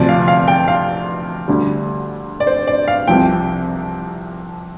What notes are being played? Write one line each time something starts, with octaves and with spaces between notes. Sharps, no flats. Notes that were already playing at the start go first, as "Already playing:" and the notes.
Already playing: D2 C3 F3 D5
F5
F5
G5
F5
D2 D3 G3
D5
C5
D5
F5
C2 C3 F3 C4 G5